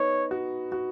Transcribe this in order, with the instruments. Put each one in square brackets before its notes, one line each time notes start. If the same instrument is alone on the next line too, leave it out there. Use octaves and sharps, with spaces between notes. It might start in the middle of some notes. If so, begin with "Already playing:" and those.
Already playing: [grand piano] B3 D#4 [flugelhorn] C#5
[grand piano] F#4
F#4